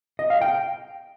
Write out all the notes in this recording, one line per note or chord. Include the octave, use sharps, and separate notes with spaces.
D#5
F5
G5